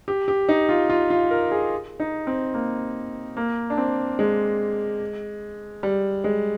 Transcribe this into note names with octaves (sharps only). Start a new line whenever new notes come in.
G4
G4
D#4
F4
F4
F4
A#4
G#4
D#4
C4
A#3
A#3
D4
C4
G#3
G3
G#3